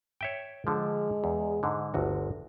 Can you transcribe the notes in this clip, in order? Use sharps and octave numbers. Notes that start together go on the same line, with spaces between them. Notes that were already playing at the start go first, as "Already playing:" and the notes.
C#5 E5 G5
D3 F3 G#3
E2
G#2 D3
G1 D2 F#4